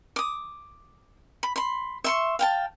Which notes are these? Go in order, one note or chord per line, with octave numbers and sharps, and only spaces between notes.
D6 D#6
B5
B5 C6
E5 C6 C#6
F5 G5 A5